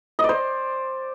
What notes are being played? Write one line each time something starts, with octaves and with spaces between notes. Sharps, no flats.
D#5
D5
C5